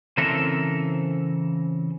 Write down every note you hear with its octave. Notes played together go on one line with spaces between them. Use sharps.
C#3 E3 C4 A4 A#4 E5